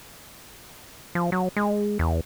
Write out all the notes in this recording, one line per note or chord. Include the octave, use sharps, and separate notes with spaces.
F3
F#3
G#3
E2